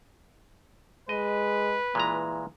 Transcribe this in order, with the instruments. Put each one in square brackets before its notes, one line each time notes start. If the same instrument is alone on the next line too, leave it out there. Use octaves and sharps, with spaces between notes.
[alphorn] G#3 [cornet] B4 [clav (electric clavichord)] D#5
[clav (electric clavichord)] A#2 G#3 A#5 [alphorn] E3